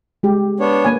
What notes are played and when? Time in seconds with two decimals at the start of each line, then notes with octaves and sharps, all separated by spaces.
0.23 G#3 G4
0.60 B3 D4 C#5
0.85 A#3 B4 G#5